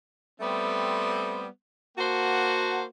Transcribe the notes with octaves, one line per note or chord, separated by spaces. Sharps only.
G3 A3 B3 C4
A#3 F#4 C5 F#5 A5